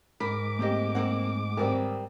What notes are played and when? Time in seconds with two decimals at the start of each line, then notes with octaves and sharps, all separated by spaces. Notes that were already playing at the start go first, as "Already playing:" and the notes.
0.20 G#2 A#4 B5 D6 B6
0.59 A3 A#3 C4 G4 D#5
0.95 A#3 C4 F#5
1.57 G#1 G3 C4 A#4